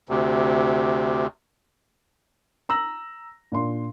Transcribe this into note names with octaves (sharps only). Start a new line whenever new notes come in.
D2 C3
A#5 E6 A#6 F#7
A#2 D4 C6